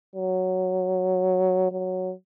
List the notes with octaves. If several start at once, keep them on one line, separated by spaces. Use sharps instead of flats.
F#3
F#3